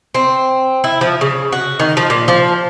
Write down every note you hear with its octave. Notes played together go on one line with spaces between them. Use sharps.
C4
E4
F3
C#3
F#4
D#3
F3
A#2
F3